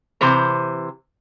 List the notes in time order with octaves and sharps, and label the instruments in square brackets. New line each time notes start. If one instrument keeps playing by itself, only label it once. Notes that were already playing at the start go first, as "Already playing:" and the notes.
[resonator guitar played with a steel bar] C3 E3 C5 A#5